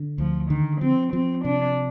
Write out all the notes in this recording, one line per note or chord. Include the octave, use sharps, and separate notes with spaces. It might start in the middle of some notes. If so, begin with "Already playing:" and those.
Already playing: D3
D2 F3
D3 D#3
F3 C4
F3 C4
C3 D4